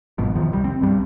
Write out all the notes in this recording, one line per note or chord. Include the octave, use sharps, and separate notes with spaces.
G#1 G2 B2 F3
E2 C3 D#3 F3
C2 G3
C4
B1 G2 G3